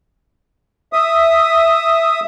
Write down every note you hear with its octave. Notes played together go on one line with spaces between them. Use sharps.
E5 D#6